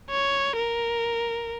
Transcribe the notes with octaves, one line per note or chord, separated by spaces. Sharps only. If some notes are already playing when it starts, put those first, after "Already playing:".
C#5
A#4